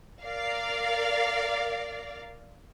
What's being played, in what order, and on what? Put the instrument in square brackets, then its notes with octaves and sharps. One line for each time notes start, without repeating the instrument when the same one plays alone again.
[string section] A#4 D5 F5